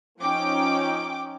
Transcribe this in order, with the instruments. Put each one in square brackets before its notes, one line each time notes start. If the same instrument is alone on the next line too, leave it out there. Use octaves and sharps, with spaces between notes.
[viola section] F3 C#4 D#4 [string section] G5 D6